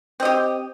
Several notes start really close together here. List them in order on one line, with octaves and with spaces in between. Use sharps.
C4 D#5 G4